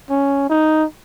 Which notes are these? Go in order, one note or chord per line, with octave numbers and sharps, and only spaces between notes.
C#4
D#4